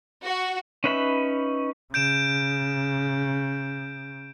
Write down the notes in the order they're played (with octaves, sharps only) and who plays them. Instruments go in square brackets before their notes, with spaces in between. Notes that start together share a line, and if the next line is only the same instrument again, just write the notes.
[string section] F#4
[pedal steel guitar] C#4 D#4 B4 E5 B5
[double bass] C#3 [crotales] G6 D7 E7